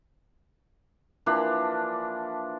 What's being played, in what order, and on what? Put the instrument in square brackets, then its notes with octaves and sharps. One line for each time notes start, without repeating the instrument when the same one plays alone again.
[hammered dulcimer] E3 F3 A#3 D4